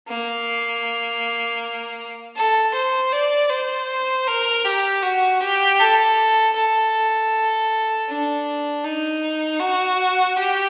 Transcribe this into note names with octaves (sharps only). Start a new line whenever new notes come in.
A#3
A4
C5
D5
C5
A#4
G4
F#4
G4
A4
A4
D4
D#4
F#4
G4